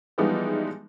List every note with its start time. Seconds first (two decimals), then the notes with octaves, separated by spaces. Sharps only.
0.18 E3 F3 G3 G#3 B3 D#4